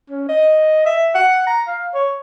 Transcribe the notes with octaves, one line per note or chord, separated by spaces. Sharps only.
C#4
D#5
E5
F#5
A#5
F5
C#5